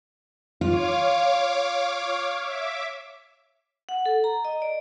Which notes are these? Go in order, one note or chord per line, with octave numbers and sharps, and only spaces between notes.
F4 C#5 F5 D6
E5 D6
F#5
A4
A#5
D#5
D5